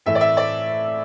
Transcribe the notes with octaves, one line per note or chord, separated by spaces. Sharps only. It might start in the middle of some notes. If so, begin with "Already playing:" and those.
A2 E3 A3 E5
D5
E5
D5